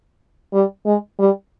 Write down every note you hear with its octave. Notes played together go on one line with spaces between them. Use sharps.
G3
G#3
G3